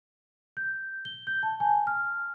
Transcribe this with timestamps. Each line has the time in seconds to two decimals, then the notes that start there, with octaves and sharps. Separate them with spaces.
0.57 G6
1.05 G7
1.27 G6
1.43 A5
1.60 G#5
1.87 F6